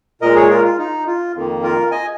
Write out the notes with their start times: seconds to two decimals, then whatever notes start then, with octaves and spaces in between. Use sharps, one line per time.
0.21 A#2 G#3 A#4 D#5
0.35 G#4 C#5
0.50 F4 A#4
0.64 F4
0.78 D#4
1.07 F4
1.35 F2 D#3 A#3
1.63 F4 A#4
1.91 D#5 G#5